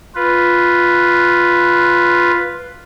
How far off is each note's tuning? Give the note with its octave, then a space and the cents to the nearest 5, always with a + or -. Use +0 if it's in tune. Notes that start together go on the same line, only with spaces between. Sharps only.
F4 +0 B4 +0